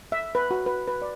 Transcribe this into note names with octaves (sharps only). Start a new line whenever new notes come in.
E5
B4
F#4
B4
B4
D5